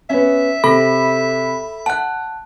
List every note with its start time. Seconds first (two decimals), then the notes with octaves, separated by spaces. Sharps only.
0.10 B3 C#4 E5
0.64 C3 A4 B5
1.86 F#5 A5 F#6